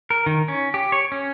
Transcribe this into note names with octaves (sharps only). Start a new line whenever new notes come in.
A#4
D#3
C#4
G4
C#5
C#4